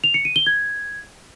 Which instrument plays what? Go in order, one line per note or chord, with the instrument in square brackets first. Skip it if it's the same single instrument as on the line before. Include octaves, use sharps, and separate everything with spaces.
[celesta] F7
C#7
D#7
G7
G#6